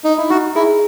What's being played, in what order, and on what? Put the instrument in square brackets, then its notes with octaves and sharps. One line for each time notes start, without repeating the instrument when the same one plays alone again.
[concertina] D#4
E4
[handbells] D#4 [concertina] F#4
[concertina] E4 [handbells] G#4